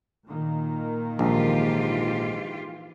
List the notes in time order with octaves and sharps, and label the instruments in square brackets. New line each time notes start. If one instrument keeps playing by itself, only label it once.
[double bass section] A#2 D#3 A#3
[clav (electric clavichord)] A#1 [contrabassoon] G#2 [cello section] E3 F4 G4